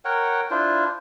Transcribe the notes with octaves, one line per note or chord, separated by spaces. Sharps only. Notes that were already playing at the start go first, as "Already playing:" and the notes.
A#4 C#5 F#5 G5
D4 E4 F4 C5